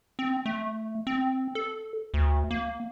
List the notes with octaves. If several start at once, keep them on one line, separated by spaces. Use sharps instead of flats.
C4
A3
C4
A4
D2
A#3